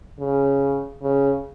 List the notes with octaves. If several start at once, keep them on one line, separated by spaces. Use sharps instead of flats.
C#3
C#3